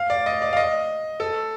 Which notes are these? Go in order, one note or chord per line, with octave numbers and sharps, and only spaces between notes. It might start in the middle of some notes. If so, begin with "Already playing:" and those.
Already playing: F5
D5
D#5
D5
F5
D#5
A4